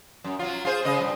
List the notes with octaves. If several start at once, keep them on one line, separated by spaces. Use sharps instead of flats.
F#2
F#3 F4
F4 G#4 C5
C#3 D#5
G2